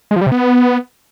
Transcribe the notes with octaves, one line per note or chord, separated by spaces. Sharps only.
G#3
F3
G3
C3
B3